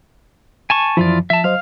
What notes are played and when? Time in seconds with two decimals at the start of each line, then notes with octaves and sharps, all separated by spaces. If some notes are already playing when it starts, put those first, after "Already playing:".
0.70 G#5 A5 C#6
0.97 F#2 E3 F3 E4 F4 D5
1.30 F3 E5 A5
1.44 F#3 C5 D#5 F5